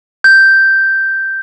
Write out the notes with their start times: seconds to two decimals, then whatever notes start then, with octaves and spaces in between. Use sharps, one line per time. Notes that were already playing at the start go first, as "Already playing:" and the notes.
0.24 G6